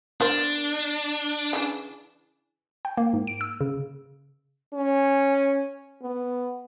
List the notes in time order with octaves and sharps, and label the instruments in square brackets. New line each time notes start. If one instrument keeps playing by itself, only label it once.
[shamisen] B3 A#4 C5 [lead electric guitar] D4
[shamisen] C#3 E3
[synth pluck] G5
A#3
G#2
D7
E6
C#3
[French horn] C#4
B3